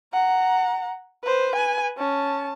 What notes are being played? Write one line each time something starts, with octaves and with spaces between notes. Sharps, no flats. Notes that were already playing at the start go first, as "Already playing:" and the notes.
F#5 A#5
B4 C5
B4 G#5
C#4 A5